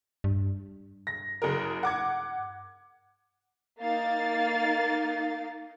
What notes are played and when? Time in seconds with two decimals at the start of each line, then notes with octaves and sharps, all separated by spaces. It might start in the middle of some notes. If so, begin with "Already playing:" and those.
0.24 G2
1.07 A#6
1.42 F#1 G#4 A#4
1.83 F#5 D6 G#6
3.79 A#3 D#4 F5 A6